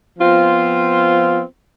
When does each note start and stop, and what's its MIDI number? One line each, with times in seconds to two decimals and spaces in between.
0.19 1.41 53
0.19 1.41 59
0.19 1.41 60
0.19 1.41 65